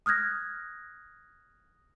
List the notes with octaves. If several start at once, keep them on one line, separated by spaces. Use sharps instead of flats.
D#6 F6 F#6 G#6 A#6